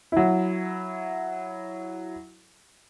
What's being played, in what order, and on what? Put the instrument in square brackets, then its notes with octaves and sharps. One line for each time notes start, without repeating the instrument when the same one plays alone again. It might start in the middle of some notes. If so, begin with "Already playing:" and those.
[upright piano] F#3 E4